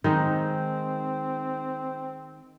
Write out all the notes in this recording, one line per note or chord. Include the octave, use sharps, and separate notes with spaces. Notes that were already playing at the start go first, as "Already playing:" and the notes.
D#3 G#3 C4 D#4